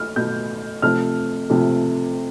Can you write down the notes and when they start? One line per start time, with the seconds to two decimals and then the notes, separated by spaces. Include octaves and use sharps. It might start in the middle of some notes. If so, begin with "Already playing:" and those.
Already playing: A3 F6
0.16 B2 A3 G6
0.82 C3 F3 A3 F6
1.50 C3 F3 A3